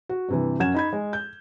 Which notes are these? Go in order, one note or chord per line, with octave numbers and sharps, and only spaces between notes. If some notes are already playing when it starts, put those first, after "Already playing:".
F#4
G2 C3 E3
F#2 C#4 F#5 G#6 E7
D#4 B5 G#6
G#3
G6